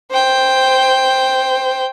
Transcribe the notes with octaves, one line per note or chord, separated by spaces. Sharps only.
C5 G5